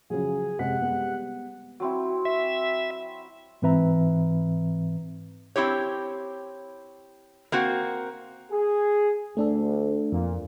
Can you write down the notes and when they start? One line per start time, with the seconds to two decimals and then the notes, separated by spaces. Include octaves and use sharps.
0.10 C#3 F3 F#3 G#4
0.59 C3 G#3 F#5 B6
0.81 G3 G#3 B3
1.80 F#3 C4 E4
2.25 E5
3.62 G#2 E3 C4 B4 E5 A#5
5.56 C4 E4 G4 C#5
7.52 A#3 C4 F#4
8.52 G#4
9.37 D2 A3 D4 A4
10.12 F2 A#2